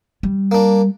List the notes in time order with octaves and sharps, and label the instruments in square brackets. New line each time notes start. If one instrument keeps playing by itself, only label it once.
[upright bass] G3
[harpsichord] A#3 D4